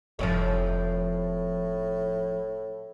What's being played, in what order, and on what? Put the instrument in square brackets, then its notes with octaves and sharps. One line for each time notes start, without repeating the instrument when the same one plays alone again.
[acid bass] F1 [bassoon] A2 [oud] F3 C4 C#5